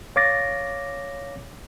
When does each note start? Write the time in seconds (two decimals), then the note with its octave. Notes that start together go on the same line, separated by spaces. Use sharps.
0.16 C#5 F5 D6 A6 A#6